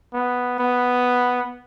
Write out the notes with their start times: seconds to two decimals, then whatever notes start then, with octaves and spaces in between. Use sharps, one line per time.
0.14 B3
0.59 B3